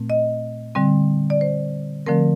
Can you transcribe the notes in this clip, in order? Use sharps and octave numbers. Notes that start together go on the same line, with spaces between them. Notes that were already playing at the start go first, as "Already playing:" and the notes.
Already playing: A#2 A3 C4
D#5
D3 G3 C4
D5
C5
D3 F3 A3 C4 A#4